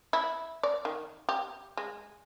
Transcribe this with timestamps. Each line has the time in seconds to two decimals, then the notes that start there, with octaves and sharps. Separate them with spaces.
0.13 E4
0.63 D5
0.85 D#3
1.29 G4
1.77 G#3